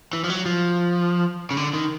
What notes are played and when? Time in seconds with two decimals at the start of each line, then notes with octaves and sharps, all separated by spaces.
0.13 E3
0.24 F3
0.30 F#3
0.46 F3
1.51 C#3
1.57 D3
1.73 D#3